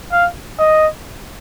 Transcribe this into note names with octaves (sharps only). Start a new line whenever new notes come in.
F5
D#5